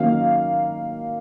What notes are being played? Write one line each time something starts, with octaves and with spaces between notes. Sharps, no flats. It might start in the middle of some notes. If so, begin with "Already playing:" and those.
Already playing: D#3 F#3 A#3 C#4 F5